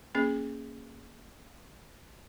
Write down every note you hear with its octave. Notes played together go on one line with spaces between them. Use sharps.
A#3 C#4 G#4